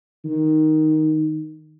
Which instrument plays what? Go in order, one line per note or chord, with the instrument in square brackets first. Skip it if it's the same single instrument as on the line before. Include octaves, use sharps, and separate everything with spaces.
[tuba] D#3